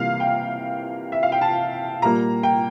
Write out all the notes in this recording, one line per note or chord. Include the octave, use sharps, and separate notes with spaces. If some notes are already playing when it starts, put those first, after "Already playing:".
Already playing: C3 E3 G3 A#3 F5
G5
E5
F5
G5
A5
A#2 G3 A#3 A#5
G5